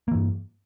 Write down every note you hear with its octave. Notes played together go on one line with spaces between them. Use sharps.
G2 E3 A#3